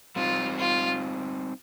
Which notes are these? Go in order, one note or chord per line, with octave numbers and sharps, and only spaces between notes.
G3 C4 D#4 F4
F4